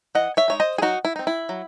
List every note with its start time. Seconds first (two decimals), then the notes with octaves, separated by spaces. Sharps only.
0.15 E3 D#5 F#5
0.37 C#5 E5
0.48 G#3 D#4 C#5
0.60 C5 D#5
0.78 G#4
0.82 F#3 D#4 F#4
1.05 E4
1.16 C4 D#4
1.27 E4
1.49 F#3